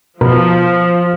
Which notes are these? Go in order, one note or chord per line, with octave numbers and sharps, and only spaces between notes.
B2 F3 A#4 B4